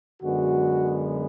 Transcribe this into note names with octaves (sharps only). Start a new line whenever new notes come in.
F#2 D3 G#3 B3 F#4